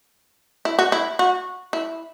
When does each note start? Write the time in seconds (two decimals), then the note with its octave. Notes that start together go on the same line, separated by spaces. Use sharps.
0.65 E4
0.79 F#4
0.92 E4
1.19 F#4
1.73 E4